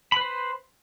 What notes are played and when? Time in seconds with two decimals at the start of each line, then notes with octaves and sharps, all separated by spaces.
0.12 B5
0.17 B4
0.21 C5